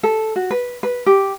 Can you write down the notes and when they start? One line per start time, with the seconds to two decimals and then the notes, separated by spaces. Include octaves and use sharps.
0.03 A4
0.36 F#4
0.51 B4
0.83 B4
1.06 G4